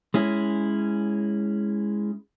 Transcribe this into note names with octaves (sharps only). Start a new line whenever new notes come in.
G#3 C#4 E4